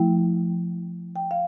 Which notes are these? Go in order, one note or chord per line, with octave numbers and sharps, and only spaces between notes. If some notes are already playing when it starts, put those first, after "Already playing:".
Already playing: F3 A3 E4 G5
G5
F5